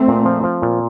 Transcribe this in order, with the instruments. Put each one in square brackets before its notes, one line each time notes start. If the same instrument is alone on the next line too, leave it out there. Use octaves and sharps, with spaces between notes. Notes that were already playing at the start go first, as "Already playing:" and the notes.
Already playing: [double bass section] A3 C4
[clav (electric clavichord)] A#2
F3
F3
A#2